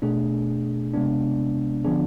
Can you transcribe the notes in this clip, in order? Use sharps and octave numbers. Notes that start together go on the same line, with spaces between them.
B2 A3 D4 G#4
C3 G#3 B3 D4
D3 F3 B3 D4 G#4